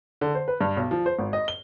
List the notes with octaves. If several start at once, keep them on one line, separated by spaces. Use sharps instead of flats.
D3
C5
B4
G2
B1
F3
C5
G#1
D#5
G7